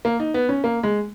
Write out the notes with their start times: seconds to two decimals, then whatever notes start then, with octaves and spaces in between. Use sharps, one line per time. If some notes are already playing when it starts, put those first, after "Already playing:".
0.05 A#3
0.20 D#4
0.34 B3
0.49 C#4
0.64 A#3
0.83 G#3